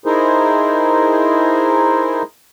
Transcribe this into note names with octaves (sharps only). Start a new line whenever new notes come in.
D#4 E4 G#4 A#4 C5